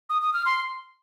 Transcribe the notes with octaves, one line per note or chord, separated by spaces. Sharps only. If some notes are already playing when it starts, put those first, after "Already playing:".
D#6
D#6
F6
C6